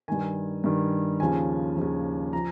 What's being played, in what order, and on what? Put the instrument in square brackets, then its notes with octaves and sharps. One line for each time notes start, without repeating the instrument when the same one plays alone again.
[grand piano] G2 D#3 G#5
G2 D#3
D#2 C#3 F3 G#5
D#2 C#3 F3
F3 A#5